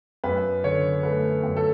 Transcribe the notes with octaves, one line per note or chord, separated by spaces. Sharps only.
F#2 B4
D3 C#5
A3 B4
F#2
A4